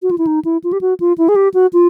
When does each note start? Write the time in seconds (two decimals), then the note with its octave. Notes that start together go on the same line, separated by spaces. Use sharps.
0.03 F#4
0.11 F4
0.18 E4
0.27 D#4
0.45 E4
0.64 F4
0.73 G4
0.81 F#4
1.00 F4
1.18 E4
1.29 G#4
1.36 G4
1.54 F#4
1.73 F4